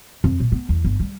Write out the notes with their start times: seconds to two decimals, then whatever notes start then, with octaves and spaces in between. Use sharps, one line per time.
0.24 F2
0.40 A#2
0.52 B3
0.69 E2
0.84 G1
1.00 G3